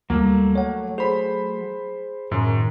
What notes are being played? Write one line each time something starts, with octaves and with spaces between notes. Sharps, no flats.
D2 F#3 G3 A3 A#3 E6
C#5 F#5
G#4 C5 B5
F#2 A2 D#3